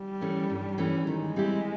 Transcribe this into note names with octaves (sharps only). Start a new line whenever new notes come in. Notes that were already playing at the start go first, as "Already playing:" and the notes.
Already playing: G3
E3 A3 C#4
G2
E3 A3 C#4
D#3 G#3
G3 C4 E4 G4